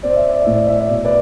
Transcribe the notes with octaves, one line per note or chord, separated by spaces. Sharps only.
C4 D5
E5
D5
A2 E5
D5
E5
D5
B2 E5
B4 D5